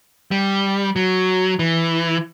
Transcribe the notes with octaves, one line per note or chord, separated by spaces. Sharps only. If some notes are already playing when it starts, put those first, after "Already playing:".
G3
F#3
E3